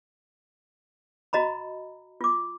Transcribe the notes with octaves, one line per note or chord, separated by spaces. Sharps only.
F#4 D#5 A#5 B5
F4 D6